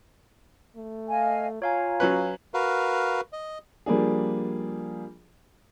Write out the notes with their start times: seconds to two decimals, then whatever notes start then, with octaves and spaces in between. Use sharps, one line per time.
0.76 A3
1.09 D#5 F5 G#5
1.62 F4 C#5 F5 G#5 A#5
2.00 F#3 C#4 B4
2.54 F#4 A#4 B4 F5
3.33 D#5
3.86 F3 G3 A#3 D4 G#4